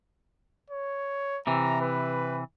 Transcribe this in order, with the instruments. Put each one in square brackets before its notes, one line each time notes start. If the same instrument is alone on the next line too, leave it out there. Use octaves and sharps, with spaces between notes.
[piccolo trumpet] C#5
[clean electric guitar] C3 E3 [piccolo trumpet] A#5
[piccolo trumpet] B4